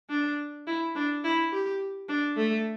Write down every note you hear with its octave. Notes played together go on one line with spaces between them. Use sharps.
D4
E4
D4
E4
G4
D4
A3